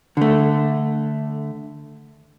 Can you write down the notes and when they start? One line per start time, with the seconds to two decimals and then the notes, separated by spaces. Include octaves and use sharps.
0.17 D3 A3